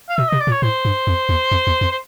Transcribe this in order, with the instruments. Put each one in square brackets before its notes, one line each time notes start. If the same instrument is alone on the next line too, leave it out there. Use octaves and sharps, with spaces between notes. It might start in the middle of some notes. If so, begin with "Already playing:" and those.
[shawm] F5
[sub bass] B2 [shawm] E5
[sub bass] C3 [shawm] D#5
[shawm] D5
[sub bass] A#2
[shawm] C#5
[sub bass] A2 [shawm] C5
[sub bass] G2
F2
E2
F2
E2
F2
[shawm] C5